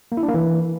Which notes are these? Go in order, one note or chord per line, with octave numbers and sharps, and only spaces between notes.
A#3
E4
D4
A#3
E3